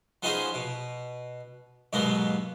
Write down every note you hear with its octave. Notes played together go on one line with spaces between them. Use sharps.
F3 B3 C#4 D#4 G#4 C5
B2
D#2 G#2 B2 F#3 A#3 B3